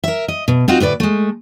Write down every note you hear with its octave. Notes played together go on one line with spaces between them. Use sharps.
A#4 E5
D#5
B2
C4 D#4 F4 F#4
D2 A2 B4 D5
G#3 A3